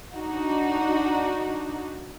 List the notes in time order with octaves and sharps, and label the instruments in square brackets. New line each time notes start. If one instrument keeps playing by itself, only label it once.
[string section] D4 D#4 F#4